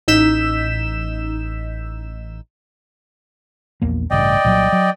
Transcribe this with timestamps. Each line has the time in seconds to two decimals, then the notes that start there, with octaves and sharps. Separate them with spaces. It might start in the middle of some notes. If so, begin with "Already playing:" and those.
0.08 A1 D#4 E6 G6 B6 E7
3.82 A#1 E2 A#3
4.10 A1 G2 C#3 D5 D#5 G5
4.44 C2 A#2 F#3
4.72 F#3